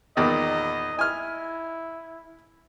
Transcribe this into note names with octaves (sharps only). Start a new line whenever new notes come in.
E2 A#2 D#3 D#5
E4 G#5 F6